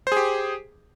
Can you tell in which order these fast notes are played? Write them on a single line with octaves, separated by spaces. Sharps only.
C5 G#4 G4